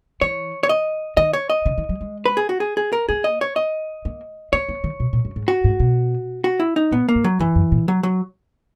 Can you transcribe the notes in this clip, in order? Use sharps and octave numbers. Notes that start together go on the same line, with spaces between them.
E3 C#5
C#5
D#5
D#3 D#5
C#5
D#5
C#3
D#3
F#3
G#3
B4
G#4
F#4
G#4
G#4
A#4
A#3 G#4
D#5
C#5
D#5
A#3
A#3 C#5
B3
D#3
B2
A#2
F#2
G#2
F#4
G#2
B2
F#4
E4
D#4
A#2 B3
A#3
G#2
F#3
F#2 E3
F#2
A#2
F#3
F#3